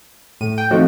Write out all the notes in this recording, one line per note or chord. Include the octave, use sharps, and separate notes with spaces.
A2 D#7
G5
F3 A3 C4 D#4 F#4